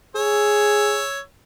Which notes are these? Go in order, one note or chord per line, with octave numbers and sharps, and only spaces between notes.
G#4 C#5 E6